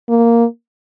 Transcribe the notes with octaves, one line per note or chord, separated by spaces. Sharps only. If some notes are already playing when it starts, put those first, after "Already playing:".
A#3